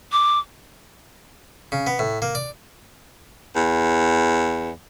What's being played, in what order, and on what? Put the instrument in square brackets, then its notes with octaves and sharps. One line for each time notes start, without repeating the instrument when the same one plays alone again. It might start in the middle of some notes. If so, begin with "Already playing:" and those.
[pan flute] D6
[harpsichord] C#3
B3
A2
A#3
D5
[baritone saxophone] E2